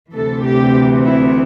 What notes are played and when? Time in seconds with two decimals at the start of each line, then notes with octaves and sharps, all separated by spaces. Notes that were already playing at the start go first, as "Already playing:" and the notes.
0.13 D2 C3 E3 A4
0.44 G4
1.06 E4